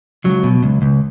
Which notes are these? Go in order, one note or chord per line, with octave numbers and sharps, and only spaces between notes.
C#2 F#3
B2
C#2
C#2